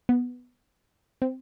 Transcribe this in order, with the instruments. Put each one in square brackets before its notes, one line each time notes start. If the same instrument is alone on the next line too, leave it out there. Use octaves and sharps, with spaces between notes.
[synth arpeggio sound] B3
C4